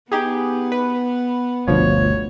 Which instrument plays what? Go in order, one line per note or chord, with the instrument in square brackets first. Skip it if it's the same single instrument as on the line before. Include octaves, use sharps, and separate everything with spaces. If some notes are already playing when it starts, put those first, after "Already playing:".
[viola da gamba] B3 [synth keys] D#4 G4 G#4
[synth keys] B4
[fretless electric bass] G1 D2 B2 [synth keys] F3 [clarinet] C#5